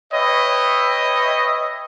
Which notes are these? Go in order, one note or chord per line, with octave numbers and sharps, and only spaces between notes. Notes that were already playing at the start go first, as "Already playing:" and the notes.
B4 C#5 D#5 E5 G5